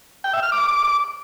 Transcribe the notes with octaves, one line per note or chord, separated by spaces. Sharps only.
G5
E5
F6
D6